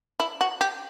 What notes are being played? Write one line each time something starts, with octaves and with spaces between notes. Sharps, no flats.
E4
F#4
G4